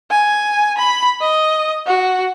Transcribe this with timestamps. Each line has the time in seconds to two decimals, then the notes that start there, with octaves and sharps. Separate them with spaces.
0.11 G#5
0.78 B5
1.21 D#5
1.87 F#4